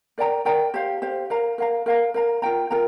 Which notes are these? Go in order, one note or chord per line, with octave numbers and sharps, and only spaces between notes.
A#4 D5 G5 A#5
A#4 D5 G5 A#5
G4 C5 F5
G4 C5 F5
A#4 F5 A#5
A#4 F5 A#5
A#4 F5 A#5
A#4 F5 A#5
F4 A#4 G5 A#5
F4 A#4 G5 A#5